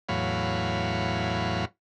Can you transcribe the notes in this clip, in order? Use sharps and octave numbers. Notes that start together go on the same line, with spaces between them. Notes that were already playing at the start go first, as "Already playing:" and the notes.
E2 A2 F#3 C#5 F5 B5